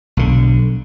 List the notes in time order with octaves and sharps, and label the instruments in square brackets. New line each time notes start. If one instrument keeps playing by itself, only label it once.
[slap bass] B1 D3